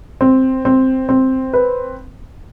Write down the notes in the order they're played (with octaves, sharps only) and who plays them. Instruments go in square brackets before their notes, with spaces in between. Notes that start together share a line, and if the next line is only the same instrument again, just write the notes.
[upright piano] C4
C4
C4
B4